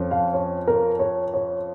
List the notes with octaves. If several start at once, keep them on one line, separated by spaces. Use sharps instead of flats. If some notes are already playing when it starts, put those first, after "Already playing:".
Already playing: F2 F3 C#4
F5
C#5
A#4
C#5
C#5